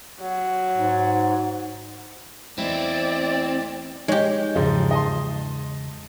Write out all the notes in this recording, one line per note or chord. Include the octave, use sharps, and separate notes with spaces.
F#3
G#2
E2 A3 C4 E4 D5 D#5
G#3 D#4 G4 C#5
E2 G#2 C#3 F3 D#4
D#5 A5 C6